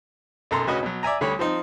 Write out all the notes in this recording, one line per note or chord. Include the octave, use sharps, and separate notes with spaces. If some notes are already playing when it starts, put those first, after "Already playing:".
B1 F#2 A4 A#5 C6
D2 C#3 C#4 F#4 B4 D#5
B2 F#3
D5 E5 G#5 A#5
D2 D3 G3 C#5 B5
F3 C4 D#4